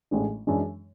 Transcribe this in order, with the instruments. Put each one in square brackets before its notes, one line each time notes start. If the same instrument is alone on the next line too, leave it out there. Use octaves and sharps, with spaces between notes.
[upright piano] A1 A2 G#3 D4
F#2 E3 G#3 D4